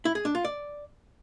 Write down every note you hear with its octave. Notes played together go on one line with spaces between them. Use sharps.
E4
G#4
D4
F4
D5